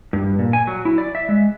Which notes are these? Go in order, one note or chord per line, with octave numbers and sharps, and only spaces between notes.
G2
A#2
G#5
F#3
E4
D5
E5
G#3